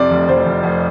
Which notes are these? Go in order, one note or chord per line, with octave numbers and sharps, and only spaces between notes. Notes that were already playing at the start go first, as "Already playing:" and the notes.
Already playing: F2 C3 D5
F1
F1 C5
F1
F1